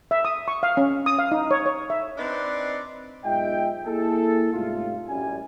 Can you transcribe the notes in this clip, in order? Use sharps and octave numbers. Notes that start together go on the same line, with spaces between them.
E5
D#6
C#6
F5
C#4
D#6
F5
D#4
C#5
C#5
E5
C4 D4 D#4 B4 D5
B1 G#2 F4 D#5 E5 G5
A#3 E4 G#4 A4
G#2 C3 G3 A3 F4
A1 F#2 G3 G#5